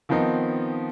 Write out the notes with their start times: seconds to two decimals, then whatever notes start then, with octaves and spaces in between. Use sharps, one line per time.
0.09 D#3 F3 B3 C4 D#4